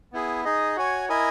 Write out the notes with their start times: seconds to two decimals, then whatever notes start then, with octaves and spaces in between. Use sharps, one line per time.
0.12 B3 E4 G#4
0.45 D#4 G#4 D#5
0.76 F#4 C#5 G#5
1.09 E4 A#4 D#5 G#5